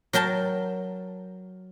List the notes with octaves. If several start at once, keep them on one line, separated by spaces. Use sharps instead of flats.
F#3 A#4 G5 A5